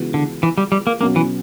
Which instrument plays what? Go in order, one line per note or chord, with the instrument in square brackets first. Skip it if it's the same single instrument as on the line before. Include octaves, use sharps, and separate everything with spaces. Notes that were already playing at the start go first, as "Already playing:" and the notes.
Already playing: [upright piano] C#2 C#3 E3 B3 F#4
[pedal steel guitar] D3
E3
G3
G3
A#3
[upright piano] B2 F#3 C#4 F#4 [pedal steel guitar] A#3
[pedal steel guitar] E3